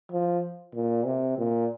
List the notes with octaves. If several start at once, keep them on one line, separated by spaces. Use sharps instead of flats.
F3
A#2
C3
A#2